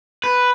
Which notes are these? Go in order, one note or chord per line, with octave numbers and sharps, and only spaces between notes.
B4